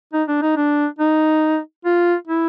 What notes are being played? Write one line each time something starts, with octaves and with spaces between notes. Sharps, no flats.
D#4
D4
D#4
D4
D#4
F4
E4